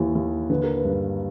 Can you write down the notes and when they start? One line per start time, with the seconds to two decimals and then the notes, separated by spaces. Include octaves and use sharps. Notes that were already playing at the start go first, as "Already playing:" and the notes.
Already playing: D#2 E3
0.15 D#2
0.50 D3 B4
0.64 A#4
0.77 B4
0.85 G2